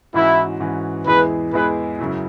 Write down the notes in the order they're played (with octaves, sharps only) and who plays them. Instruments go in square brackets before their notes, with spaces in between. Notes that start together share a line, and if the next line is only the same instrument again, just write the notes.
[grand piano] G#2 E3 C#4 F#4 B4 [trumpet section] E4
[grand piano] G#2 E3 C#4 F#4 B4
[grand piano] E2 E3 G#3 E4 G#4 [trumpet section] B4
[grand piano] E2 E3 G#3 E4 G#4 [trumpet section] B4
[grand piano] F#2 C#3 F#3 E4